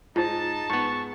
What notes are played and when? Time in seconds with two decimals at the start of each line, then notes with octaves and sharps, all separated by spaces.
0.16 G#2 D#4 F4 C5 A5
0.70 G#2 B3 C#6